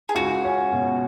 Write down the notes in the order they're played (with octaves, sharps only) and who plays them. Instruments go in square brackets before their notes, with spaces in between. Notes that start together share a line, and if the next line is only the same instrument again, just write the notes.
[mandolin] G#4
[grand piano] C#2 [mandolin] F#4
[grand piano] C#4
B2